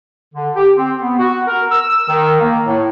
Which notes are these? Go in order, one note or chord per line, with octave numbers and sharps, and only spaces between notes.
D3
G4
C4
B3
F#4
A#4
E6
D#3
A#3
A2